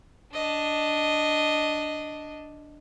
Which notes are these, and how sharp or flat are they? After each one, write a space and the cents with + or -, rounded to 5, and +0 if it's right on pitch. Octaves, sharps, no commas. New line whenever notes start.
D4 +0 D#5 +0